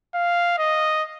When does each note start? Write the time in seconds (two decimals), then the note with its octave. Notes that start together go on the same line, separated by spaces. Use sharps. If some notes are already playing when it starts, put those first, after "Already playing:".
0.15 F5
0.58 D#5